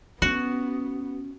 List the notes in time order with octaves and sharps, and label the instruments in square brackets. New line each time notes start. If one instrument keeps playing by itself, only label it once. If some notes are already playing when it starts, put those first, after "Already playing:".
[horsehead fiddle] B3 [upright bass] C#4 [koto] F#4